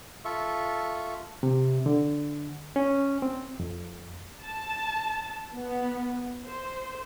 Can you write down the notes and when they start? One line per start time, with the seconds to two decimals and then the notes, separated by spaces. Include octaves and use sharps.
0.25 F4 A4 E5 C#6
1.43 C3
1.86 D3
2.76 C#4
3.22 C4
3.60 F2
4.43 A5
5.54 B3
6.46 C5